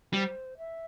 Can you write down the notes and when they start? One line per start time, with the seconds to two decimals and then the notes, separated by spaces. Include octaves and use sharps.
0.13 G3 C5
0.58 E5